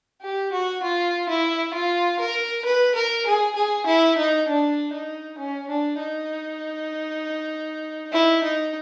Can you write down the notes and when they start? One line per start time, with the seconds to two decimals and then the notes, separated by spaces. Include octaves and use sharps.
0.22 G4
0.52 F#4
0.83 F4
1.28 E4
1.73 F4
2.19 A#4
2.65 B4
2.95 A#4
3.26 G#4
3.55 G#4
3.86 E4
4.17 D#4
4.48 D4
4.93 D#4
5.38 C#4
5.69 D4
5.99 D#4
8.12 E4
8.43 D#4